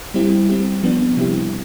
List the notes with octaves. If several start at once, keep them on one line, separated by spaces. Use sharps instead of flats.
G3 C4 E4 G4
G3 C4 G4
F3 B3 D4
C3 G3 C4 E4 G4